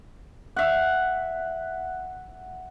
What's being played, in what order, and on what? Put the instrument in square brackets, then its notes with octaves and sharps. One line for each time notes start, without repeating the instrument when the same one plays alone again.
[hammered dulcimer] E5 F#5